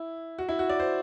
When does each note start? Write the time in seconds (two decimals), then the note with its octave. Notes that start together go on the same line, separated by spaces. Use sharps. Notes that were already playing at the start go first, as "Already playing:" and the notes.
Already playing: E4
0.39 F#4
0.49 E4
0.59 F#4
0.69 D5
0.80 C5